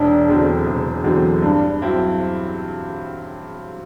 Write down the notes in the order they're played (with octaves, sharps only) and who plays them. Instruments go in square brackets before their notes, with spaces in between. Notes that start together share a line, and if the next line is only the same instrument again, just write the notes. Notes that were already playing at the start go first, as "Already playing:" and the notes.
Already playing: [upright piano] E1 [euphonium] D4
[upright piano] E2 D3 F#3 C4
E1
E2 D3 F#3 C4
[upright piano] G2 [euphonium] D4
[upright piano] F#3 C4 E4